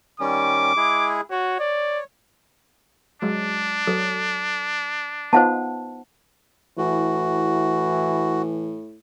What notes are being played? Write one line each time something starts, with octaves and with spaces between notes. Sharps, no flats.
D#3 G3 C#4 D6
G#3 E4 G#4
F#4 C#5
D5
F#3 G#3 D4
F#3 A4
B3 D#4 F4 C5 F#5 A5
A2 E3 F#4